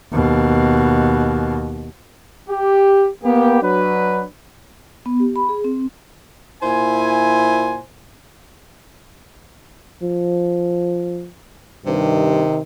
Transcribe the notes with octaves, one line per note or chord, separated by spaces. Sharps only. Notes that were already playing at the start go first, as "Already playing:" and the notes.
D#2 B2
G4
A#3 B3 G4
F#3 D4 B4
B3
G4
B5
G#4
C4
A#2 E4 C5 G#5
F3
G2 C3 D#3